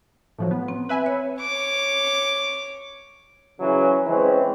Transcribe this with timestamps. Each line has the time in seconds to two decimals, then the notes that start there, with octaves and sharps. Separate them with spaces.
0.38 A2 F3 F#3
0.51 B3
0.68 C4
0.89 B4 E5 G#5
1.06 C#5
1.41 C#5 D6
3.60 C#3 E3 F#3 C#4
4.07 E3 G#3 C4 C#4